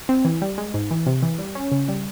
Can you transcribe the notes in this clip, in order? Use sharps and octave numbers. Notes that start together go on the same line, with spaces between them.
C4
E3
G3
G#3
G#2
E3
C3
E3
G3
C#4
C#3
G3